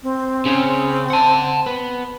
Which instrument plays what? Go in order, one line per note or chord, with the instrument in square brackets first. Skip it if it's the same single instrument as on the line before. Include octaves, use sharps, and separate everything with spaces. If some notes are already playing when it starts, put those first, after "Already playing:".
[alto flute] C4
[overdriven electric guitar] C#3 C#4
F#5 A5
B3